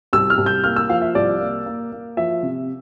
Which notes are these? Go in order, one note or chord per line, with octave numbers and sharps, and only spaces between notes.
C2 E6
F6
C2
G6
A#3 F6
E6
F3 F5
E5
C2 D5
A#3
A#3
A#3
F3 E5
C3